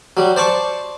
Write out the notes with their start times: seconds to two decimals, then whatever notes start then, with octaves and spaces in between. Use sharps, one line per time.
0.17 F#3 G3
0.36 C5 D5 A5 C#6